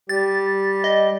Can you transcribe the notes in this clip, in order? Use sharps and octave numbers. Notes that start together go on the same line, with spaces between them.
G3 G4 A6
D#5